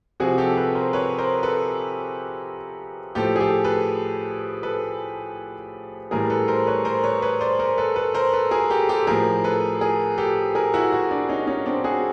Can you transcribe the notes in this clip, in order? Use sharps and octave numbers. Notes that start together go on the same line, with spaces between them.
C3 F3 F#4 G#4
G4 A4
A4 B4
A#4 C5
B4 C#5
A#4 C5
A4 B4
A2 F3 G4 A4
G#4
G4 A4
A4 B4
A4 B4
A2 E3 G3 G#4 A#4
A4 B4
A#4 C5
B4 C#5
A#4 C5
B4 C#5
B4 C#5
C5 D5
A#4 C5
A4 B4
A4 B4
A#4 C5
A4 B4
G#4 A#4
G4 A4
G4 A4
A2 F3 G#4 A#4
A4 B4
G#4 A#4
G4 A4
G#4 A#4
E4 F#4
E4 F#4
D4 E4
C#4 D#4
C#4 D#4
C4 D4
F#4 G#4